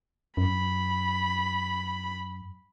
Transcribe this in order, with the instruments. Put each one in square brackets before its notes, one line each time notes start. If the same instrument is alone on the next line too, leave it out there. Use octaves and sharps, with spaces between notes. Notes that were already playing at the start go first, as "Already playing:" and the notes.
[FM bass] F#2 [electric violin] B5